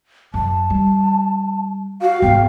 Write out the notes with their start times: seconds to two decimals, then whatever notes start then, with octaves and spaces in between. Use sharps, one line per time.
0.34 F#2 A5
0.70 G3
2.02 F#4 F5
2.22 G#1 B3 G5